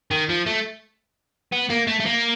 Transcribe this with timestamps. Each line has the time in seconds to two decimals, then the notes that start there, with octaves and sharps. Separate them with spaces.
0.11 D#3
0.29 F3
0.46 A3
1.53 B3
1.70 A#3
1.87 A3
2.00 A3
2.06 A#3